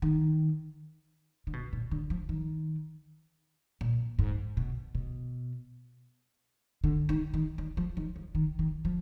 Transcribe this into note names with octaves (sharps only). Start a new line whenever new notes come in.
D#3
D3
B2
A#2
D3
F3
D#3
A#2
G#2
B2
B2
D3
D#3
D#3
D#3
F3
D#3
F3
D#3
D#3
F3